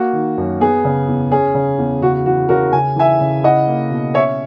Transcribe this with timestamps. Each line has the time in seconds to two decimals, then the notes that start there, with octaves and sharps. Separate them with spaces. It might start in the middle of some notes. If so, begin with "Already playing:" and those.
Already playing: A#3 F#4
0.13 D#3
0.38 F#2
0.60 B3 G#4
0.85 C#3
1.08 E2
1.31 C#4 G#4
1.54 C#3
1.79 E2
2.02 C#3 F#4
2.26 E3 F#4
2.49 C#3 F#4 A#4
2.73 C#3 G#5
2.96 E3 E5 G#5
3.20 C#3
3.43 E4 D#5 F#5
3.67 A#3
3.91 B2
4.14 C#4 C#5 E5